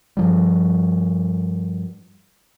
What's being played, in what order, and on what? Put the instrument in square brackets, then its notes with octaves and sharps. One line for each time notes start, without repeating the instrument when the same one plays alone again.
[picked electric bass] G2 F3 G3